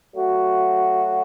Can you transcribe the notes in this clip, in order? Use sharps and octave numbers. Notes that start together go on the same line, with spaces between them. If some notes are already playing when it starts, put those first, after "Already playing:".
F#3 A3 F#4